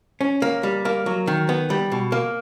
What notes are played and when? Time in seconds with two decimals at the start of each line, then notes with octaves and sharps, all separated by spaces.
0.21 C#4
0.42 A#3
0.63 G3
0.85 A#3
1.06 F#3
1.27 D#3
1.49 B3
1.70 G3
1.92 B2
2.12 A#3